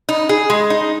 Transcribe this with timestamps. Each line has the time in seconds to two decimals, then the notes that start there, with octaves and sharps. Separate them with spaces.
0.09 D#4
0.29 G#4
0.50 G#3
0.70 D#4